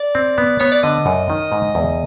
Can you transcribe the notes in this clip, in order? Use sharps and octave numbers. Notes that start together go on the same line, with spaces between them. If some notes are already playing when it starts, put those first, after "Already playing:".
Already playing: D5
C4
B3
B3 C#5
D5
D3 D#5
F#2
D#3
G#2
E2